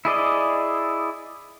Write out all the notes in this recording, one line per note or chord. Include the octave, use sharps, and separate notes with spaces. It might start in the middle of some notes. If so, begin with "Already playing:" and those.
E4 G#4 D5 D#5